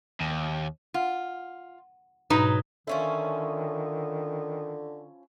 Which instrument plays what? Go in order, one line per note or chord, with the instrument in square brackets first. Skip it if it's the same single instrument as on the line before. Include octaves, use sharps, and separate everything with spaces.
[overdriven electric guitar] D#2
[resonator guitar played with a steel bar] F4 [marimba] F#5
[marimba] G#2 B2 [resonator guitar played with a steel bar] F#3 D#4 B4
[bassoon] D3 [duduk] D#3 [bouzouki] F3 C#4 E4